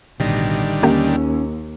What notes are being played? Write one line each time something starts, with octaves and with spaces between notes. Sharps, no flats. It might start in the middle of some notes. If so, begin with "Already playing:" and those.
A1 B2 D3 D#3 G3
D#2 A#3 C#4 G4